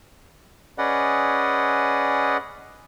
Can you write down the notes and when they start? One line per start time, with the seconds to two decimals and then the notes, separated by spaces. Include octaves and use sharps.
0.78 C#4 G#4 B4 D5 D#5 F#5